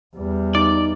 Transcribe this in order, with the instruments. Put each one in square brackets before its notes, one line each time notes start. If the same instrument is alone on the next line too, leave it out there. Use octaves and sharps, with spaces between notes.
[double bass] E2 G3
[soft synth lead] D#4 [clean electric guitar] D5